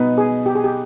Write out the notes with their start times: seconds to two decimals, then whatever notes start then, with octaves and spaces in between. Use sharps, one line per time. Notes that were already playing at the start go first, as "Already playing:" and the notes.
Already playing: B2 B3 D#4 B4
0.18 G#4
0.46 G4
0.55 G#4
0.64 G4